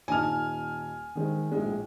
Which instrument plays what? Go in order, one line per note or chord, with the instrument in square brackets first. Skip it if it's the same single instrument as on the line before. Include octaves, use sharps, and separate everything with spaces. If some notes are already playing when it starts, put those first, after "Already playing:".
[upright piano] D#1 D#4 A5 [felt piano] G#5 F6
[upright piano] D#3 G#3 C5
A#1 A2 G#3